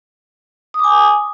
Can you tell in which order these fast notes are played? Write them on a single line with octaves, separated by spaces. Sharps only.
D#6 D6 G#5